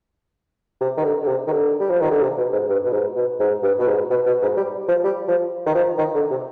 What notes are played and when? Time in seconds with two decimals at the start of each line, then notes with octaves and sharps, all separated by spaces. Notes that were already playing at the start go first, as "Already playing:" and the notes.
0.81 C3
0.97 D#3
1.04 D3
1.22 D3
1.27 C3
1.47 D#3
1.51 D3
1.80 G3
1.90 F3
2.01 D#3
2.11 D3
2.22 C3
2.37 B2
2.53 G#2
2.69 G2
2.85 B2
2.92 G#2
3.16 B2
3.40 G#2
3.63 G2
3.79 B2
3.87 G#2
4.10 B2
4.26 B2
4.42 G#2
4.57 G3
4.88 F3
5.04 G3
5.28 F3
5.66 D#3
5.74 F3
5.98 D#3
6.15 D3
6.30 C3